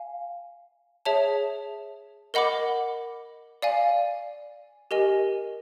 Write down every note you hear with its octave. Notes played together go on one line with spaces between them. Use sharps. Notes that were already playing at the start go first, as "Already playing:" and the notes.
Already playing: F5 G#5
G#4 C#5 E5 A5
A#4 D#5 F#5 B5 D6
D5 F5 G#5
G4 A#4 D#5 G#5